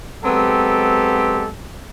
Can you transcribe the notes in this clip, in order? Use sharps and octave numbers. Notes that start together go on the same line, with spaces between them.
F#3 G#3 B3 C4 G4 A4